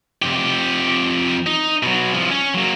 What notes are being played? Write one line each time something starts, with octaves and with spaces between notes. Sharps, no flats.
F2 G4
D#4
B2 F#3
C2 F3
C#4
F#3 A#3